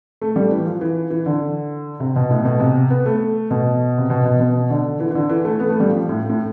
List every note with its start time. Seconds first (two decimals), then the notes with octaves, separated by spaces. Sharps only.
0.21 A3
0.36 G3
0.50 E3
0.66 F3
0.81 E3
1.10 E3
1.26 D3
2.00 C3
2.16 B2
2.31 A2
2.45 B2
2.60 C3
2.90 B3
3.06 A3
3.50 B2
3.98 C3
4.10 B2
4.25 B2
4.40 B2
4.70 D3
5.00 E3
5.11 E3
5.15 D3
5.29 E3
5.45 A3
5.60 B3
5.69 A3
5.80 G3
5.89 F3
6.09 A2
6.30 A2